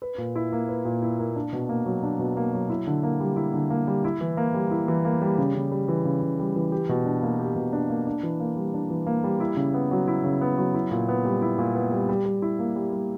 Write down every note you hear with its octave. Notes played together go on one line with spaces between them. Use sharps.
B4
A#2
E4
A#3
B4
A#2
E4
A#3
D4
B2
A#3
F#3
D4
B2
A#3
F#3
E4
D3
A#3
G3
E4
D3
A#3
G3
E4
E3
A#3
G3
E4
E3
A#3
G3
C#3
C#3
G3
E3
C#3
C#3
G3
E3
G4
B2
D4
A#3
G4
B2
D4
A#3
D4
E3
A#3
G3
D4
E3
A#3
G3
E4
C#3
B3
F#3
E4
C#3
B3
F#3
E4
A#2
B3
G3
E4
A#2
B3
G3
G3
G3
E4
A#3
G3
G3